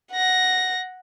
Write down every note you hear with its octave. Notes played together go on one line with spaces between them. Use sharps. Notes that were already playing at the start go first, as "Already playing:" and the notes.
F#5 A#6